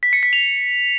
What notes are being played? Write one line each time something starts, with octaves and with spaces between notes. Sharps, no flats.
B6
C#7
B6
F7